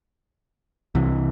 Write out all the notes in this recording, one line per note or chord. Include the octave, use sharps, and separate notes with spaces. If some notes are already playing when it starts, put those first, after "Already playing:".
C2 C3 E3